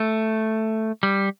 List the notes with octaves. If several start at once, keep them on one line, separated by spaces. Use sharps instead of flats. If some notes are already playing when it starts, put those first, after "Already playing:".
Already playing: A3
G3